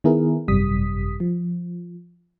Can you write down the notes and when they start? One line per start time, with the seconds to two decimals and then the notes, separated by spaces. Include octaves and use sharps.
0.04 D#3 B3 E4 G#4 A#4
0.48 G#1 F#2 C3 G3 D#6 B6
1.20 F3